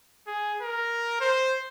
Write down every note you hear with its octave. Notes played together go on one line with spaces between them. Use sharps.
G#4
A#4
C5